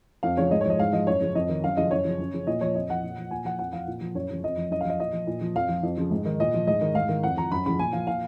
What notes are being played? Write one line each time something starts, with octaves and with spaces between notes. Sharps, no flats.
F2 F5
C#3 F3 C#5
G#2 D#5
C#5
F3 D#5
G#2 F5
F3 D#5
F#2 C#5
C#3 F3
F2 D#5
D#3
F#2 F5
C#3 F3 D#5
F#2 C#5
C#3 F3
F#2
C#3 F3
A#2 D#5
F3 C#5
F2 D#5
F3 F#5
A#2
F3
A#2 G#5
F3 F#5
F2 F#5
F3 F5
A#2
F3
F#2 C#5
C#3 F3
F2 D#5
F3
F#2 D#5
F5
F3 D#5
A#2 D#5
F3
A#2
F3
F2 F5
F3
F2
C#3 F3
G#2
D#3
A#2 D#5
F3
G#2 D#5
D#3
G#2 F5
D#3
F2 F#5
F3 A#5
F#2 B5
C#3 F3 B5
A#2 G#5
F3 F5
A#2 F5